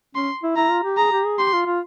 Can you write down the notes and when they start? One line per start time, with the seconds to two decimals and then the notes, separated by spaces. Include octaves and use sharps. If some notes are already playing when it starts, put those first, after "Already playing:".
0.15 C#4 C6
0.43 E4
0.56 E4 A#5
0.70 F4
0.84 G4
0.97 G#4 A#5
1.12 G4
1.25 G#4
1.39 G4 C6
1.53 F4
1.66 F4